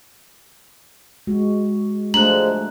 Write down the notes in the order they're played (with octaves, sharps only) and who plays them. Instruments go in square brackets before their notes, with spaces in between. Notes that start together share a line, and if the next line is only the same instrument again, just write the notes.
[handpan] G#3 F#4
[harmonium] F3 G#3 [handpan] A3 D4 [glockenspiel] A#5 F#6 [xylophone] F#7